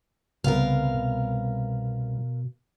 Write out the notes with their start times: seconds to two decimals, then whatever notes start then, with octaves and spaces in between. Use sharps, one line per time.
0.44 C2 C#3 B3 A#4 F5
0.95 B2